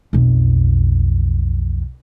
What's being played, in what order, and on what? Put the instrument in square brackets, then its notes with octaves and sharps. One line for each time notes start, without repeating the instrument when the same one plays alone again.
[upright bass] B1 F2